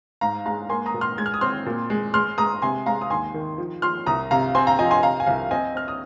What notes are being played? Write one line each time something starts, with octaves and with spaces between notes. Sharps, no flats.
G#2 F5 A#5
G#3 F5 A#5
A#3 G#5 C6
A#5 D#6
A#2
C6 F6
G#3 G#6
F6
D#6
C4 C6 F6
A#2
G#3
G#3 C6 F6
G#3 A#5 D#6
C3 G#5 C6
G#3 F5 A#5
D#6
D#2 G#5 C6
D#3
F3
F3 C6 F6
C2 A#5 D#6
C3 F5 A#5
C4 G#5 C6
F5 A#5
F3 D#5 G#5
G#5 C6
C3 F5 A#5
G#5
C2 F5
C4 D#5 G#5
C4 F6
D#6